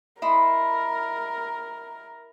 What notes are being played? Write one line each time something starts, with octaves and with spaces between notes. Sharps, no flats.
E4 A#4 D#5 C6